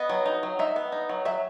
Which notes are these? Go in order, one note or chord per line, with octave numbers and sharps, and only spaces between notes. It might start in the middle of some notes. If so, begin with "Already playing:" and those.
Already playing: B3 D#5
F#3
D#4
F#3
D#4 E5
B3
D#4
F#3
F#3 E5